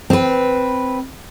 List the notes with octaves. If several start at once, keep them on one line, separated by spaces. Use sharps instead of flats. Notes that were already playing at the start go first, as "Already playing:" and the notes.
C4 B4